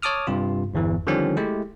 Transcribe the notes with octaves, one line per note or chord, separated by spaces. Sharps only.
C#5 A5 D6 D#6 F6
G2 C3 F4
G1 E2 E3
D3 D#3 F3 G3 C4 C#4
G#3 A3 E4 G4